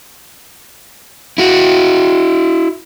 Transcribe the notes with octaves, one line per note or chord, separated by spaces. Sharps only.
E4 F#4